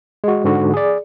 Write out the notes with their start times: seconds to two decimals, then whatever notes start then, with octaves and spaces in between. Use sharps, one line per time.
0.24 G#3 F#4
0.44 G#2 D3 F#4
0.74 G#4 D5